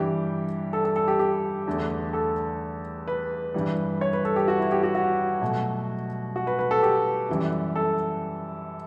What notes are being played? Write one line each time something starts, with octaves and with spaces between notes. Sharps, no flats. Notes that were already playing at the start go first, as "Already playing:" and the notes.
Already playing: G2 E3 G3 G4
A4
A4
A4
G4
G4
E2 D3 A3
A4
B4
G2 E3 G3
C#5
B4
A4
G4
F#4
E4
G4
F#4
F#4
B2 F#3 A3
F#4
B4
B4
A4
G4
F#2 E3 G3
A4